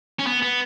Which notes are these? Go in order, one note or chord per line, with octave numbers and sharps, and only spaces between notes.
C#4
B3
B3